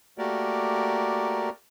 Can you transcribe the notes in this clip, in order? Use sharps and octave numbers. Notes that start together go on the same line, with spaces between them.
A3 A#3 F#4 G4 A#4 D5